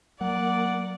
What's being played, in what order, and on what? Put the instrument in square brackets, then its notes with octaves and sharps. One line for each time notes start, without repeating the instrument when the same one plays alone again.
[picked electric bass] F#3 [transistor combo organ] A#3 [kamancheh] D5 [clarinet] F#5